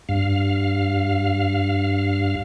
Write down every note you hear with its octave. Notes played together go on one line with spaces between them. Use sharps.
G2 F5